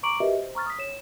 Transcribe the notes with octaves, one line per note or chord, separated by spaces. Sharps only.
A#5 C#6 D6 D7 F#7
F#4 G4 A#4 B4 D#5 E5
C5
A#5 C#6 F6 A6
D#6 B6
C#5 E7